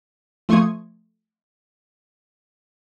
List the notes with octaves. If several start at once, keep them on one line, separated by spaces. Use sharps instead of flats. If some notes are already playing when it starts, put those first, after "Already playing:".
F3 A3 C6 C#6 D#6 G#6